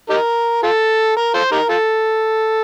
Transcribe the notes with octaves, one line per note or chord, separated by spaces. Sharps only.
D#4 G4 A#4
F4 A4
A#4
F4 A4 C5
D#4 G4 A#4
F4 A4